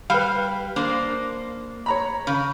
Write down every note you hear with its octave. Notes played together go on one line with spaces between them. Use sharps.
G3 B4 F5
A#3 D4 C5
C#5 A#5 B5
C#3